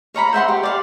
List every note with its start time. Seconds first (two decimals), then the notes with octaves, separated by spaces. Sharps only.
0.14 A#4 C#5 A#5 B5
0.33 C5 E5 F#5 C6
0.48 G4
0.63 D5 F5 F#5